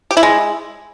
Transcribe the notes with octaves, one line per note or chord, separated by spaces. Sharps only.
G4
E4
G#3